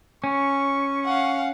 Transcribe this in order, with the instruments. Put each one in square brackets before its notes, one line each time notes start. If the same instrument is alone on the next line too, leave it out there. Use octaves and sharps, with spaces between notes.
[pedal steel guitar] C#4 [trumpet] C#6
[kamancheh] F5 F#5